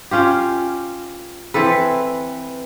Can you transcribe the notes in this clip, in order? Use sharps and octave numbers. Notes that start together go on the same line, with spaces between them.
C#4 F4 G4
E3 C4 A4 B4